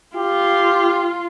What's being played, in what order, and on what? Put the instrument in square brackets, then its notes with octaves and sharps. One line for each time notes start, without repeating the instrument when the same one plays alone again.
[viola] F4 [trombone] G4